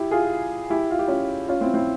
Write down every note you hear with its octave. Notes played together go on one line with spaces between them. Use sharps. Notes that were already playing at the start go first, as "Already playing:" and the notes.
Already playing: E4 G4
F4 G#4
E4 G4
F4
G4
C#4 F4
C#4 F4
C4 E4
C4 E4